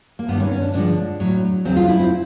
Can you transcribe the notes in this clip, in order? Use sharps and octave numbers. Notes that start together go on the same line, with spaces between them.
A#3
G2 D#3 G3 B3
C#4
C#4
D4
G2 D3 F3 G#3 D4
A2 F#3
E2 C#3 F#3 C4
F4
E4
C4